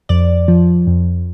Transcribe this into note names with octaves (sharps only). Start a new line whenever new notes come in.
F2 D5
F3
F2